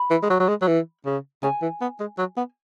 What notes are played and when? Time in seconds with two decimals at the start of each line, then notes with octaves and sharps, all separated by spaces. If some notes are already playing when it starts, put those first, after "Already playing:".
Already playing: B5
0.11 E3
0.22 G#3
0.30 F#3
0.40 F#3
0.48 G#3
0.62 F#3
0.68 E3
1.06 C#3
1.43 C#3 G#5
1.62 E3
1.81 B3
2.00 G#3
2.18 F#3
2.37 B3